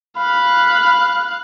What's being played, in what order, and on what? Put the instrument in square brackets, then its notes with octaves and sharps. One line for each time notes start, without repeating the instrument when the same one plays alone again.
[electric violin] F5 F#6 [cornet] B5